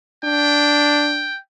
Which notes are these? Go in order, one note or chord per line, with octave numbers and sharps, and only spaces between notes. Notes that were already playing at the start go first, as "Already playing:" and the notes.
D4 G5